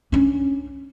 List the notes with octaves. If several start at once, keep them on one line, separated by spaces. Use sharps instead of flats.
C#4 D4